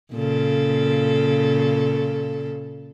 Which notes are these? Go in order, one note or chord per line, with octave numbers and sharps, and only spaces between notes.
A#2 C#3 A4